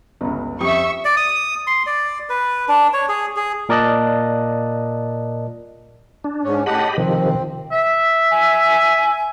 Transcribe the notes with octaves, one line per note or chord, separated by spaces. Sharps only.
G1 C#2
F2 G4 E5 C#6 D#6
D5
D#6
C6
D5
B4
D4
C#5
G#4
G#4
A#2 A#4 D5 D#5 A5 F#6
D4
G#2 C#4
A2 G4 D#5 F#5 A5 B5
C3 D#3 F3 C4
E5
G#5